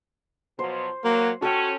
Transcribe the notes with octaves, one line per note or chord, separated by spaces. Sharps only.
B2 F3 F#3 C5
F#3 A#3
C#4 F#4 A4 G5